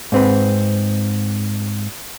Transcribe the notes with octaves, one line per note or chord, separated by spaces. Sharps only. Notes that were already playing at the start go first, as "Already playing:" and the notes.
G#2 C4 B4